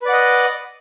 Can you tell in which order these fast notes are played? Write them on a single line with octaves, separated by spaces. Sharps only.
B4 D5 F#5 D#5